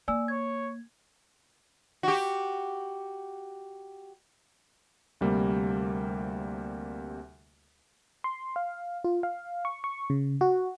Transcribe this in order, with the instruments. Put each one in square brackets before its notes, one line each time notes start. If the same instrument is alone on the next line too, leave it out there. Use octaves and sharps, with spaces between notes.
[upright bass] A#3 [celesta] D5 G#5 E6
[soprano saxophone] C#5 [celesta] G#6
[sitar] F#4 G4
[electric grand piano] D2 C3 G3 A#3
[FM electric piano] C6
F5
F4
F5
C#6
C#6
C#3
F#4